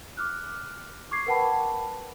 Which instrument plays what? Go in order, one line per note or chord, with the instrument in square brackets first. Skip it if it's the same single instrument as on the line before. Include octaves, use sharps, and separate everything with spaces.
[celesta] D6 F6 F#6
C#6 D6 G#6 C7
A#4 B4 F#5 G5 A5 B5